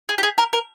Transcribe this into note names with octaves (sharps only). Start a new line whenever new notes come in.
G#4
G4
G#4
A#4
A#4